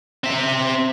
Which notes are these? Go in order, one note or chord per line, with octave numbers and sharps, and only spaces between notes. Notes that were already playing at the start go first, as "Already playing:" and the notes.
C4 E5